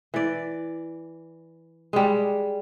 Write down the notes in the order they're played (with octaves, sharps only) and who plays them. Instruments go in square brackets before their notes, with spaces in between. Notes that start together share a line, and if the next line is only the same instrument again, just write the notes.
[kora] E3 D5
G3 G#3